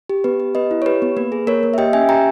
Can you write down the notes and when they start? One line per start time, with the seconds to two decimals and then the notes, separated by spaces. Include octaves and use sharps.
0.09 G4
0.24 B3 B4
0.40 G4
0.55 B3 B4 D#5
0.71 E4
0.82 C#5
0.86 G4 B4
1.02 B3
1.17 A#3 B4
1.32 G#4
1.47 A#3 A#4 C#5
1.63 A#3
1.74 E5
1.78 G4 D#5 G5
1.93 C#4 E5 G#5
2.09 G4 G5 A#5